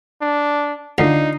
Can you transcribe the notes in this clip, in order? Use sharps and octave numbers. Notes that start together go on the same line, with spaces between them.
D4
D2 D4 D#4 F4 C7